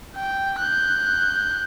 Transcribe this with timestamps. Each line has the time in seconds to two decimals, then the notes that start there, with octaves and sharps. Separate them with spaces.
0.16 G5
0.60 F#6 G6